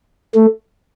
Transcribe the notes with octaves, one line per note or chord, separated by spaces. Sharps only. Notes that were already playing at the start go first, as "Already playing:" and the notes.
A3